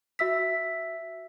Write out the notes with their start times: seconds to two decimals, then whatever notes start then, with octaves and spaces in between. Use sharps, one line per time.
0.19 F#4 E5 E6 B6